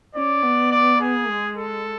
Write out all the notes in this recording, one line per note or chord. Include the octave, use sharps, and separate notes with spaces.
C#4 D5
B3
D5
G#4
G#3
A4